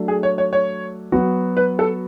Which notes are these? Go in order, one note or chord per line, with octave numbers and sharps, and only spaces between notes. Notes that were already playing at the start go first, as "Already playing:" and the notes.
Already playing: F#3 A3 D4
G#4
C#5
C#5
C#5
F#3 B3 F#4
B4
A4